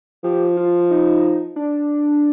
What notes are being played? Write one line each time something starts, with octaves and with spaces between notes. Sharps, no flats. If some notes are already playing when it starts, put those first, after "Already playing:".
F3 G4
F4
D#4
D4